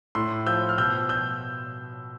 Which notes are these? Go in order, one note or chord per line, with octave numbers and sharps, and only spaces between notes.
A2 C6 E6
F3 E6 G6
F6
B2 E6 G6
E6 G6